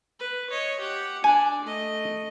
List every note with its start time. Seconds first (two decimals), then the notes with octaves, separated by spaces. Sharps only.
0.20 B4
0.50 C#5 D#5
0.80 G4 F#5
1.24 D4 D5 G#5
1.62 A3 D#5